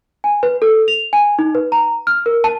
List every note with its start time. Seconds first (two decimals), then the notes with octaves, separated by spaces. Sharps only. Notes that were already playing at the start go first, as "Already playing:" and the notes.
0.24 G#5
0.43 B4
0.62 A4
0.88 F7
1.13 G#5
1.39 D#4
1.55 B4
1.72 A#5
2.07 F6
2.26 A#4
2.44 A5